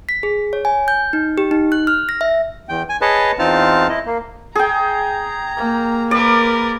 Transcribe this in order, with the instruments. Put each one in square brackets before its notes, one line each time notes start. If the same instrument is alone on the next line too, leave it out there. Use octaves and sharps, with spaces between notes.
[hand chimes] B6
G#4
C#5
G#5
G6
D#4
G4
D#4
F#6
F6
A#6
E5
[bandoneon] E2 G5
G#5
G#4 B4 C#5 D#5 A5
E2 C4 D#4 F4 A5 F6
E4 D#5
A#3
[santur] G#4 G5 [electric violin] A#5
[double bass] A#3
[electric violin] A#4 B4 [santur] D5